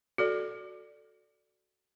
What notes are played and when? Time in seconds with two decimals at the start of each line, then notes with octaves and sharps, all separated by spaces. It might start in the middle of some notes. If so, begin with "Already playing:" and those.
0.18 F#4 A4 D5